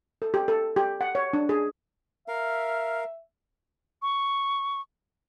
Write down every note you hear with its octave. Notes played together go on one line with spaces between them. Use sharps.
A4
G4
A4
G4
F#5
C#5
D4
G#4
A#4 E5 F5
C#6